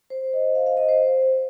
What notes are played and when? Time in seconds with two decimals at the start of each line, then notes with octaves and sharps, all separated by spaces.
0.10 C5
0.33 D#5
0.55 F5
0.66 F5
0.77 D#5
0.89 C5